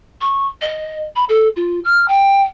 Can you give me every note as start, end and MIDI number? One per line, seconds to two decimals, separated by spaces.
0.21 0.47 85
0.61 1.03 75
1.15 1.24 83
1.29 1.48 69
1.56 1.79 65
1.84 2.08 89
2.08 2.41 79